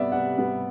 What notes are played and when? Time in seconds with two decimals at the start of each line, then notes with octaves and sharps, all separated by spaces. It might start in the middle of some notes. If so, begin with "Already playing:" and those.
Already playing: C3 G3 B3 D5 E5
0.12 C3 F#5
0.38 G3 B3